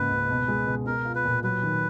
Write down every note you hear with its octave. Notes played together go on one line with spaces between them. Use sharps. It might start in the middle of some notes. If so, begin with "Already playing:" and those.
Already playing: G#2 C#3 A#3 B4
C#2
B2
G#3
B2
B3 A#4
F4
B4
A#2
F#3 B4
D#3